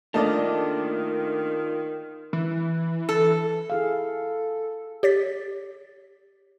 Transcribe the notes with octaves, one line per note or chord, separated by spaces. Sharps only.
D#3 A3 A#3 D4 F4 D5 D#5 A5
E3
A4
E4 G#4 A4 F5
G4 C#5 A6 B6